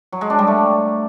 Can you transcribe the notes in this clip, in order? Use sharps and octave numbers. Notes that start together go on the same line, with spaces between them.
F#3
G#3
D4
G3
A3